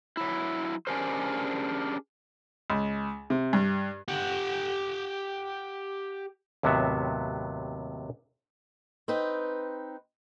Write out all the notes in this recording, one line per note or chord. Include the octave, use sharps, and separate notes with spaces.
F#3 E4
C#4 D4 G4 G#4 A#4 C5
C#2
C3
G2
G4 F#5
D#2 A2 C3 F#3 B3 E5
C4 D#4 B4